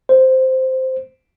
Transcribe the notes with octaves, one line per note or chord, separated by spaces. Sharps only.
C5